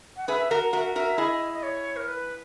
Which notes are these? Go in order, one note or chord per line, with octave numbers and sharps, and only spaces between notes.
F#5
G#4 B4 E5
F#4 A#4 F#5
F#4 A#4 E5
F#5
F#4 A#4 E5
E4 G#4 D#5
D#5
C#5
A#4
B4